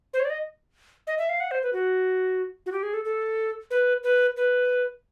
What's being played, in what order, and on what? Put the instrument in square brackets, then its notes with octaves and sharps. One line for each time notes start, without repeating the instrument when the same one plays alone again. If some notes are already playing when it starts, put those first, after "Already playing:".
[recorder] C5
C#5
D5
D#5
D#5
E5
F5
F#5
C5
B4
F#4
F#4
G4
G#4
A4
A4
B4
B4
B4